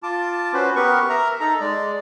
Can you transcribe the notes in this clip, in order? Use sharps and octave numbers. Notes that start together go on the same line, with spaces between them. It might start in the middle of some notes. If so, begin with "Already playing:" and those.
F4 A5 D6
C#4 F#4 B4 C5
B3 G4 A#4 B4 C#6
A#4 E5 A#5
D#4 A4 A#5
G#3 D5